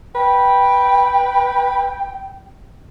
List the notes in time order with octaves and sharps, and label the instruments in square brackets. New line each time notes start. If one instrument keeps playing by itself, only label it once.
[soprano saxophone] B4 [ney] G5